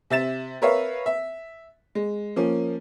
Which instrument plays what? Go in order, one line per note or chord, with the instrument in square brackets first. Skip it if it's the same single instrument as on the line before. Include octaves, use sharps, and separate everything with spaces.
[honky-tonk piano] C3 E5 A6 E7
A#4 B4 C#5 E5 F5
E5
G#3
F3 A#3 C#4